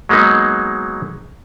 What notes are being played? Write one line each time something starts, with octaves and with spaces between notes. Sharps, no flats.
F#3 G#3 A#3 B3 D#4